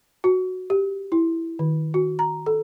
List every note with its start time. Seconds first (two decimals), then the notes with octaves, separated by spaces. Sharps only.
0.24 F#4
0.70 G4
1.12 E4
1.59 D#3
1.94 F#4
2.19 A#5
2.46 A4